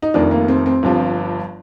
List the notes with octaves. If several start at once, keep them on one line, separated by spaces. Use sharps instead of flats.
D#4
F1 F2 D#3 D4
A#3
C4
C4
G1 G2 F3